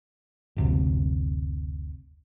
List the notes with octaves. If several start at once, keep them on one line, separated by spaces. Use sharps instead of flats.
F#1 D2 C3